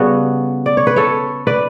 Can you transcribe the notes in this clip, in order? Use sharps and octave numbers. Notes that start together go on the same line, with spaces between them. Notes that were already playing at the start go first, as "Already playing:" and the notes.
Already playing: C#3 G3 B3 F#4 A4
D5
C#5
B4
A4 C#5
B4 D5